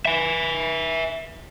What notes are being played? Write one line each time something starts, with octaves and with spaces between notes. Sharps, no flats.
E5 G#5